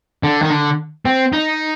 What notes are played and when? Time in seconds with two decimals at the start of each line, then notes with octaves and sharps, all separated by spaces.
0.23 D3
0.42 D#3
0.50 D3
1.05 C4
1.33 D#4